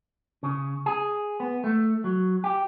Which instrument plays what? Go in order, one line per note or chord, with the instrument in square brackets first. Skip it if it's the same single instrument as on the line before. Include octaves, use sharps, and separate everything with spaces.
[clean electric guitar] C#3
G#4
B3
A3
F#3
G4